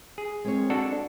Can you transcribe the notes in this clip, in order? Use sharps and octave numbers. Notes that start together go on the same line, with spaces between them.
G#4
G#3 C4 A#4 C#5
D4 F#4 A4